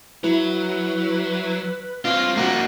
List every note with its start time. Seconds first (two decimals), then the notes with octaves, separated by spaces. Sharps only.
0.24 F#3 E4 B4
2.05 C4 D4 F4 A#6
2.37 A#3 F#4